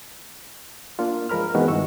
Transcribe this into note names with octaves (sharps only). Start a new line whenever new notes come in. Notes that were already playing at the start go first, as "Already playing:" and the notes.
A#3 D4 F4
F3 G#3 A#4 B5 F6
E3 G#3 B3 C4 D#4 F#4
G2 D#3 E4 C#6 E6